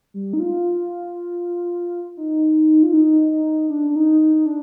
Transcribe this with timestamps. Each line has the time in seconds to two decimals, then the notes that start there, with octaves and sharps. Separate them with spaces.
0.14 G3
0.33 D#4
0.40 F4
2.17 D#4
2.83 F4
2.93 D#4
3.32 D#4
3.70 D4
3.90 D4
3.96 D#4
4.21 D#4
4.46 D4